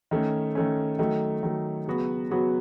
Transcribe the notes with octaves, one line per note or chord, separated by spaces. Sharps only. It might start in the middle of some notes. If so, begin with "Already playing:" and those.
D#3 A3 C#4
D#3 A3 C#4
D#3 F#3 A3
D#3 F#3 A3
C#3 F#3 B3 F#4
C#3 F#3 B3 F#4